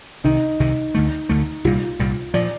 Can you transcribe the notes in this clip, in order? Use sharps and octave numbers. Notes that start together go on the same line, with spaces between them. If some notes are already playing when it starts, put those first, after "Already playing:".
C2 C3 D#3 D#4
C2 C3 D#3
D2 D3 A3
D2 D3 A3
C2 A#2 G3 F4
C2 A#2 G3
A#2 F3 D5